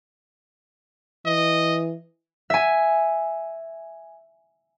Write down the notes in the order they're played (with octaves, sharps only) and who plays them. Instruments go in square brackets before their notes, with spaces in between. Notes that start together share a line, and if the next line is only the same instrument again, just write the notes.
[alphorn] E3 [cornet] D#5
[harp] E5 G#5